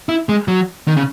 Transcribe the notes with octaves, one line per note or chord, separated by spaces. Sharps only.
E4
G#3
F#3
D#3
C#3